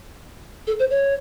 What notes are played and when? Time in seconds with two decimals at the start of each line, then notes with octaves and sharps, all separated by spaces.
0.67 A4
0.79 C5
0.90 C#5